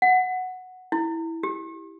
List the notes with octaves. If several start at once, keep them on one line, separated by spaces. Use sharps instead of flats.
F#5
E4
G4